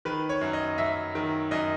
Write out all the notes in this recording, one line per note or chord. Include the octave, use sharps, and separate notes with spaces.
D#3 B4
C#5
F#2
D#5
F#2 E5
D#3
F#2 D#5